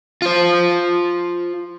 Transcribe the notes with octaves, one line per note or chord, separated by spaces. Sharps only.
F4 C5